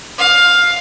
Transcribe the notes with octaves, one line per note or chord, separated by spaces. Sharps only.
F5